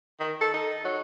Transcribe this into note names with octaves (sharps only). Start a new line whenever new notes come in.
D#3
A4
D#4
F#3